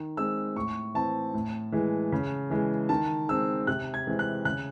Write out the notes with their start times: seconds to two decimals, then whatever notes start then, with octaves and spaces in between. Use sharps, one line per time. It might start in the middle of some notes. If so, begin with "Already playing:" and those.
Already playing: D#3
0.17 G#3 C4 E6
0.56 A2 C#6
0.94 E3 C4 A5
1.34 A2
1.72 E3 G#3
2.12 C#3
2.50 E3 G#3
2.89 D#3 A5
3.29 G#3 C4 E6
3.67 C3 F#6
3.94 G#6
4.07 E3 G#3 C4
4.19 F#6
4.45 C#3 F#6